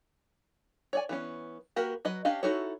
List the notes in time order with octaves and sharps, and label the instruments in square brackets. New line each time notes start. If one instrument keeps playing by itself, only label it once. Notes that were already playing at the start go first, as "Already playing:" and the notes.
[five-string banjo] C#5 D5 G#5
E3 B3 C#4
A#3 F#4 G4 A#4 B4
F#3 B4 D#5
C#4 D4 G4 D#5 F5
D#4 E4 F#4 A4 C#5